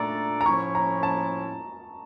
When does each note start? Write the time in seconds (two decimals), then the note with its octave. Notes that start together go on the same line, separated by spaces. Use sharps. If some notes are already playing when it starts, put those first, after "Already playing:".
Already playing: A#2 A3 D4 A4 D5 A#5
0.41 A#5
0.46 A2 F3 C#4 E4 C#6
0.75 A#5
1.03 A5